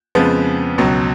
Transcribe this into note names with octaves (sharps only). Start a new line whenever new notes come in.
F2 C#3 F3 G#3 B3
C#2 B2 F#3